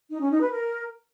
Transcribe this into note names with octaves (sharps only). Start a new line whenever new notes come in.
D#4
C#4
D#4
B4
A#4